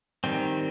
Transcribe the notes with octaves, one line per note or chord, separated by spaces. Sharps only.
D#3 G3 C4